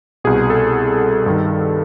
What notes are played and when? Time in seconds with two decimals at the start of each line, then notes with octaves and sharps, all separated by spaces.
0.24 C2 B2 G#4
0.50 A4
1.26 G2 D#3